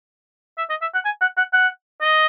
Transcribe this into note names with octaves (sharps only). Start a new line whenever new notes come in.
E5
D#5
E5
F#5
G#5
F#5
F#5
F#5
D#5